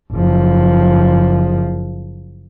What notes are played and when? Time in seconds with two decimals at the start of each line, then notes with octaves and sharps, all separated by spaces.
0.12 F#1 F3